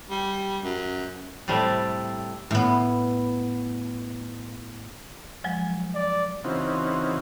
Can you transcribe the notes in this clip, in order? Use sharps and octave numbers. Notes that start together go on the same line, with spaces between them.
G3
F#2
A2 C3 G3 A3
A2 B3
F3 F#3 G#3
D5
C#3 E3 C4 D#4 F4 F#4